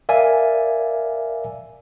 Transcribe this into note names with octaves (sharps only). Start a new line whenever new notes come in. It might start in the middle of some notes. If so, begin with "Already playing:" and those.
A#4 D5 E5 F5 G#5